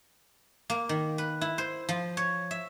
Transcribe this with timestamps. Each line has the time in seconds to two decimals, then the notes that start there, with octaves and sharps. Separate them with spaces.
0.70 A#3
0.89 D#3
1.18 B4
1.41 E4
1.58 C5
1.89 F3
2.17 C#5
2.51 E5